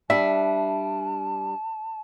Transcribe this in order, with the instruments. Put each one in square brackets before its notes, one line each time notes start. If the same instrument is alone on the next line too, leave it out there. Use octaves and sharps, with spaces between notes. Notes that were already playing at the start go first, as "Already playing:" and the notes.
[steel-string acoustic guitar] G3 D4 [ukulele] E5 [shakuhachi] A5